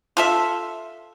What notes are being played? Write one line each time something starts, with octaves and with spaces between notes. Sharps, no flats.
F4 A4 E5